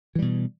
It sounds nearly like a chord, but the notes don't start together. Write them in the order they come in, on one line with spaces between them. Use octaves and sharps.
E3 G3 B2